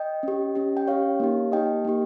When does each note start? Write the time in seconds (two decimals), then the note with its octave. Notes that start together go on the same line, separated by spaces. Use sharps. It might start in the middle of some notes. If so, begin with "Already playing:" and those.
Already playing: D#5 G5
0.23 C#4 G4
0.55 C#4 G4
0.77 G5
0.88 C#4 G4 C#5 F5
1.20 A#3 D#4 G4
1.52 A#3 D#4 G4 D#5 G5
1.85 A#3 D#4 G4